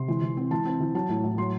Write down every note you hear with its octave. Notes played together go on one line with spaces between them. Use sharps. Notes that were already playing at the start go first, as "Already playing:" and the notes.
Already playing: C3 C6
E3
E3
C4
E3 A5
C4
E3
F#3 A5
A2
A2
F#3 C6